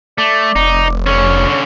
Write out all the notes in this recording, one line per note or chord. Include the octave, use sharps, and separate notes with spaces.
A3 D5
F1 D#4
D3 C#4 C#5